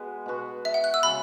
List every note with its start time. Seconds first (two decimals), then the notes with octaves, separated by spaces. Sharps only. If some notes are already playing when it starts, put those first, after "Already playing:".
Already playing: G#3 B3 F#4
0.26 B2 B3 F#4
0.65 E5
0.74 F#5
0.84 F#6
0.94 E6
1.03 C#3 G#3 C#4 F#4 B5